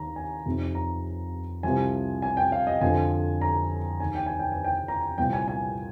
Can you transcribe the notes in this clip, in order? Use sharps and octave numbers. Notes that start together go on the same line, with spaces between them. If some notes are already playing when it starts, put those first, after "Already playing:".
Already playing: D#2 D#3 A#5
G#5
F2 C3 D#3
A#5
C2 C3 F3 G#5
G#5
G5
F5
D#5
F2 D3 F3 G#5
A#5
D#2 D#3 G#5
G5
G#5
G5
G#5
G5
A#5
C2 A#2 F3 G5
G#5
G#5